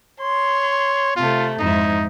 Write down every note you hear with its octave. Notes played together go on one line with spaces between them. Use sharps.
C#5 C6
C3 A3 F4
F2 G#2 D#4 E4